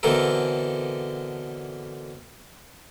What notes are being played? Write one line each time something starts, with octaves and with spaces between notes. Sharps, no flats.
B2 D3 E3 C4 A4 A#4